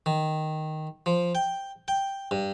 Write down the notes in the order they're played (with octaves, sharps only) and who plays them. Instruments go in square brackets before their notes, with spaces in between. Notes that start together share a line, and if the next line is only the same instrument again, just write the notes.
[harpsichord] D#3
F3
G5
G5
G2